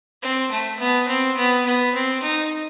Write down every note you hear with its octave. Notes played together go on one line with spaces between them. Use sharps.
C4
A3
B3
C4
B3
B3
C4
D#4